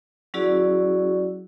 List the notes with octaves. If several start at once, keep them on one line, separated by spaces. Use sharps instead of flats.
F#3 C#4 E4 F#4 G#4 D5